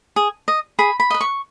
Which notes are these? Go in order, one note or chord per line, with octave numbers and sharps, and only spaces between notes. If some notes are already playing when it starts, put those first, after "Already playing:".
G#4
D#5
G#4 B5
B5
B4 D#5
C#6